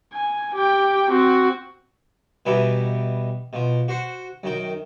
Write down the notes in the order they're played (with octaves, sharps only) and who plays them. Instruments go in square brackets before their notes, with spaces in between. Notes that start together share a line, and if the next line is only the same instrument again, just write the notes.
[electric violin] G#5
G4 G5
C4 F#4
[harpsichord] B2 E3 G3 B3 D#4 E4
B2 F3
F#4 C5 F#5
F#2 D#3 G5